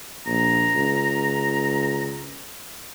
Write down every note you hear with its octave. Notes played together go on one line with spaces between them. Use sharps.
A#1 A#5
C#2